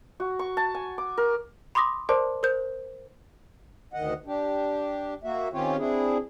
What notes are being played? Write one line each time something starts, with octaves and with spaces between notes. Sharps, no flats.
F#4
C#6
A5
G#5
D6
A#4
B5 C6 D6 D#6 A#6
A#4 C5 D5 A5 C6 D6
A#4 C5 G6
D2 D#3 D#5 F#5
D4 G4
A#3 F#4 E5
D#3 C4 C#4 F4 G4 C#5
C4 D4 E4 G#4